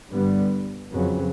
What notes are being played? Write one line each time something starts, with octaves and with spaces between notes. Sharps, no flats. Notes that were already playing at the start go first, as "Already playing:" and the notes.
G2 D3 G3 B3
F2 C#3 F#3 B3